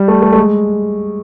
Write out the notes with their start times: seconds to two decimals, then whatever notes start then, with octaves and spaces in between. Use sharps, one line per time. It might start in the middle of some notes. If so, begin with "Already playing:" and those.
Already playing: G3
0.08 A3
0.22 A3
0.32 A3
0.37 G#3